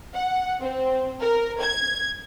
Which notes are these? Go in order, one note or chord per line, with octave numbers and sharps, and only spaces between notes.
F#5
C4
A#4
G#6